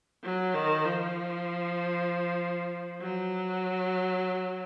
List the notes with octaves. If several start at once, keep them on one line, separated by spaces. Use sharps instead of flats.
F#3
D#3
F3
F#3